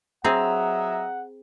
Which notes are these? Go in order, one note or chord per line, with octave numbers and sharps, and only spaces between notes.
F#3 C4 G#4 D#5 E5 F#5 A#5